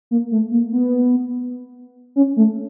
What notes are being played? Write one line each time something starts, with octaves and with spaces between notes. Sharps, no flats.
A#3
A3
A#3
B3
C#4
A3